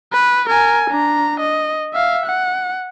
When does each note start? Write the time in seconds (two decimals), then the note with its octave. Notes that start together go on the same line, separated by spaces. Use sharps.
0.13 B4
0.49 A#4 G#5
0.90 D4 A#5
1.40 D#5
1.94 E5 F5
2.26 F#5